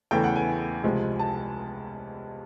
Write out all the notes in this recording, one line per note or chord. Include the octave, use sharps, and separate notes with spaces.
E2 C#3 E3 A3 G5
F#5
G#5
C#2 C3 F3 G#3
A5